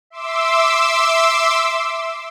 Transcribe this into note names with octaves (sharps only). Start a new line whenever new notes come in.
E5 C6 D6 E6